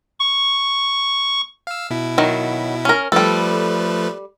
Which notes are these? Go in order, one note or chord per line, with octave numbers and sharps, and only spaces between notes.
C#6
F5 E6
B2 E4
D#3 F#3
C#4 A#4
F3 G3 A3 A4 B4